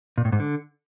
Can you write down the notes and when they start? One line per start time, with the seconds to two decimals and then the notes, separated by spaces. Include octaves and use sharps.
0.18 A#2
0.25 A2
0.32 G#2
0.40 D3